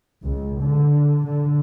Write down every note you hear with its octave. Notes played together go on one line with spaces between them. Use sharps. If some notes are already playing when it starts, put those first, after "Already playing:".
C#2
D3
D3